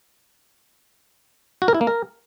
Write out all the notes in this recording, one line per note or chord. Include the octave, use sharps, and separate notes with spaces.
F#4
A#4
E4
A#3
A#4